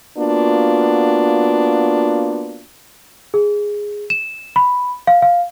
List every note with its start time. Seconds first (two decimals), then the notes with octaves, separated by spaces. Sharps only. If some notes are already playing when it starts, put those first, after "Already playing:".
0.18 A#3 B3 D4 F4 F#4
3.34 G#4
4.10 E7
4.56 B5
5.07 F5
5.22 F5